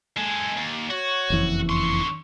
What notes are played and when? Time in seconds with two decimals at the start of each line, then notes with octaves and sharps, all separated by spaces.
0.17 G#3 A4 G#5
0.57 D#2
0.90 F#4 C#5
1.30 F#1 F2 E3
1.70 D3 C6 C#6